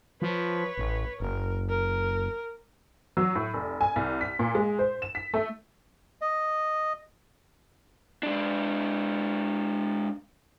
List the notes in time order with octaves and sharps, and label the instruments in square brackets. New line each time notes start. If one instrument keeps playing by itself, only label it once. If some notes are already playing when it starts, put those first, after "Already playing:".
[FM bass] F3 [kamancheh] B4 C#5
[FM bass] A1
[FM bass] F#1 [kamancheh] A#4
[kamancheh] A#4
[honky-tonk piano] F#3
A2
F1
G#5
C2
B6
A#2
G#3
C5
E7
B6
A3
[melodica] D#5
[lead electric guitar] G#3 D4